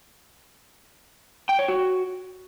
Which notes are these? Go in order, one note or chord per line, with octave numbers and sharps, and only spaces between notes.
G5
C#5
F#4